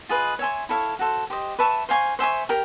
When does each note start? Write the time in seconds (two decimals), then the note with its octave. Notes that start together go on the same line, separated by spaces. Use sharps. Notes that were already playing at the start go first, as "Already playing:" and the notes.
0.09 F4 G#4 B4 D#5
0.39 C#5 E5 G#5 C6
0.69 E4 A4 C#5 F5
0.99 F#4 A4 C5
1.30 G4 C5 D#5
1.59 B4 E5 A5 C#6
1.89 C5 F5 G#5 C#6
2.19 C5 E5 G#5 C#6
2.49 G4 A#4